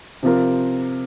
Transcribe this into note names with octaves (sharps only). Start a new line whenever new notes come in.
C3 F3 C4 F4 A#4